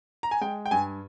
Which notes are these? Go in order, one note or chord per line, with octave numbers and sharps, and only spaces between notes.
A#5
G#5
G#3 G5
G5
G2 G#5